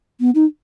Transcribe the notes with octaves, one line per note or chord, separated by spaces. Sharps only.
B3
D#4